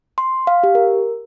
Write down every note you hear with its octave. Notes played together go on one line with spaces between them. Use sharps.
C6
F5
G4
A#4